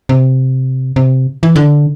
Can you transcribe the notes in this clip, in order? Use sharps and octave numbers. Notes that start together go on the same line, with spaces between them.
C3
C3
E3
D3